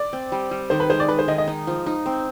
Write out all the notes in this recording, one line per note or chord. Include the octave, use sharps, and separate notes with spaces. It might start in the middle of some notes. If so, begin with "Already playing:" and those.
Already playing: D5
C4
G3
G3
D#3 C5
B4
G#3 C5
D5
G#3 B4
C5
D#3 D#5
D#5
D#4
F3
D#4
C4